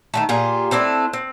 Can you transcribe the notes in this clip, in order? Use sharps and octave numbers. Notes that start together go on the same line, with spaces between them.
D#3 G3 A3
A#2 F4 G4 G#4
A3 C4 D4 E4
C4